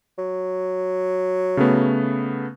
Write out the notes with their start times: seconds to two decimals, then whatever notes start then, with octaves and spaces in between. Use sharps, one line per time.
0.19 F#3
1.57 C#3 A3 B3